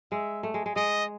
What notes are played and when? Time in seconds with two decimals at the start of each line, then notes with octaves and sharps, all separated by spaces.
0.12 G#3 E5
0.43 A3
0.54 G#3
0.66 G#3
0.76 G#3 D#5